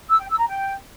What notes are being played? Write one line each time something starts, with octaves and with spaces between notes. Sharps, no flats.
E6
G5
E6
A#5
G5